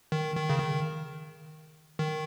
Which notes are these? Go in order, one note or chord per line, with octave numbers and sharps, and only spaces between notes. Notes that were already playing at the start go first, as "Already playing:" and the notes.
D#3
D#3
C#3
D#3
D#3